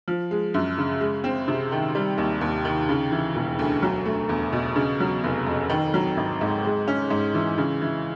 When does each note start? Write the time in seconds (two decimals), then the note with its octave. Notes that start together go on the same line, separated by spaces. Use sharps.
0.08 F3
0.31 G#3
0.54 F#2
0.78 C#3
1.01 G#3
1.24 C4
1.48 C3
1.72 D#3
1.95 G3
2.18 D#2
2.41 D#2
2.65 D#3
2.89 C#3
3.12 E3
3.35 E1
3.59 D2
3.83 F#3
4.05 A3
4.29 E2
4.52 B2
4.76 C#3
5.00 F#3
5.24 F1
5.46 F2
5.70 D#3
5.94 F#3
6.17 G#1
6.41 G#2
6.65 G#3
6.88 C#4
7.10 G#2
7.35 E3
7.58 C#3
7.82 E3